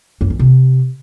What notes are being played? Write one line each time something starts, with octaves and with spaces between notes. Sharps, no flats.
F#2
E3
C3